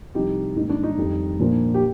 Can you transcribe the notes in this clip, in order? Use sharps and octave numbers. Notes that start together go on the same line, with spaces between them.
C2 C3 F3 D#4 G4
G#2 D#3 A#3 D4 D#4
D4
D#4
F2 D#3 G3
A#2 F3 A#3 D4
G4